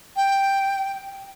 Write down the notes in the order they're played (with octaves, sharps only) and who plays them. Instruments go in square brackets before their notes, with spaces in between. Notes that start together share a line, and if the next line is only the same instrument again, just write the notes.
[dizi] G5